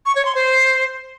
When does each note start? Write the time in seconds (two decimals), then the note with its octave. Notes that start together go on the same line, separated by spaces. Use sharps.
0.06 C#6
0.15 C#5
0.25 C6
0.35 C5